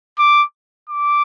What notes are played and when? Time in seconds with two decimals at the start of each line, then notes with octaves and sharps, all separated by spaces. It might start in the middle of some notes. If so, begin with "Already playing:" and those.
0.19 D6
0.89 D6